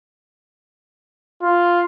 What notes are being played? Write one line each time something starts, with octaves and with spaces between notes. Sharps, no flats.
F4